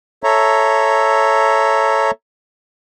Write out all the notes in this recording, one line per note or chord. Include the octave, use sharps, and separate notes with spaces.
A4 C#5 E5 A#5